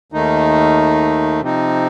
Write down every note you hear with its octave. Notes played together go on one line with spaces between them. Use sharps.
D#2 D#3 A3 D#4
C3 F3 C4 D#4